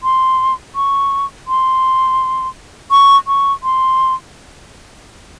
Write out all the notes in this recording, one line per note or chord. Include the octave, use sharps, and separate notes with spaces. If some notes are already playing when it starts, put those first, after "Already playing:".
C6
C#6
C6
C#6
C#6
C6